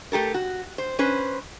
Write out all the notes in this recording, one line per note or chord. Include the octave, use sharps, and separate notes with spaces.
A3 G4 A4 A#4
F#4
C5
C#4 B4 C5